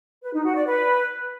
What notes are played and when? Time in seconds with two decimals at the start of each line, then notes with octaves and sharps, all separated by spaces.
0.23 B4
0.34 D#4
0.44 F#4
0.55 D5
0.66 B4